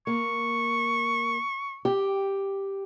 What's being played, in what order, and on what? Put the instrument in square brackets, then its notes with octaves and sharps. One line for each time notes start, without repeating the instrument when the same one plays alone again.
[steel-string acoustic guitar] A#3 [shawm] C#6
[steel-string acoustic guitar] G4